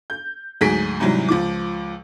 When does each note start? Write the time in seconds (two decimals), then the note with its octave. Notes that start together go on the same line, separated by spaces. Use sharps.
0.10 G6
0.61 D2 G#2 F#3 G#4 B6 D7
1.00 G#2 C3 E3 F#3 G3
1.28 C#2 F3 D6